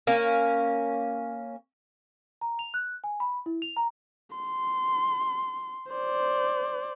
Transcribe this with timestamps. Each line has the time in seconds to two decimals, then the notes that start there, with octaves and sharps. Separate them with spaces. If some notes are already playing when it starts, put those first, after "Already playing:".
0.07 A#3 C#4
2.41 A#5
2.59 F7
2.74 F#6
3.04 G#5
3.20 B5
3.46 E4
3.62 F7
3.77 A#5
4.36 C6
5.92 C5 D5